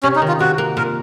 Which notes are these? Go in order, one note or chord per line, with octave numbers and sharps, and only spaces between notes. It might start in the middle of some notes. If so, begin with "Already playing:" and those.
C3 C#4
D#4
D#3
F4
C3 F#4
A#3
A#2 A#4